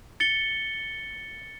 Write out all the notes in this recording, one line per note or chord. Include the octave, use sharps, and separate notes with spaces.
A6 C#7 G7